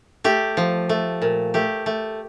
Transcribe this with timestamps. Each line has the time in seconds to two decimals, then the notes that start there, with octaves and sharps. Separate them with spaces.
0.24 A3 G4
0.57 F3
0.89 A3
1.22 A#2
1.54 A3 G4
1.86 A3